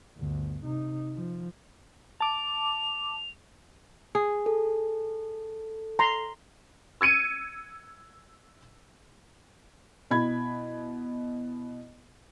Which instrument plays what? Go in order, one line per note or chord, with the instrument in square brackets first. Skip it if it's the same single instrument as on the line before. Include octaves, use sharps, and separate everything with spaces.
[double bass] G1 D2
C3 D#4
F3
[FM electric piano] A5 D6 [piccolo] F7
[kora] G#4
[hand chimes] A4
[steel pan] A#5 C6
[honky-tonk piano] E6 G#6 C#7 D#7
[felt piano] B2 E4 B5 G#6